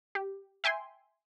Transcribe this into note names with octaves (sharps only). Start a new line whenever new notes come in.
G4
E5 G5 G#5 C6